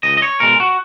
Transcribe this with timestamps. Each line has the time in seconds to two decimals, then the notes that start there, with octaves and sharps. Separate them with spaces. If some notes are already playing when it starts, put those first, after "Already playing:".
0.03 C#2 D#5
0.17 D#5
0.22 C#5
0.40 B2 G#3 A#4
0.60 F#4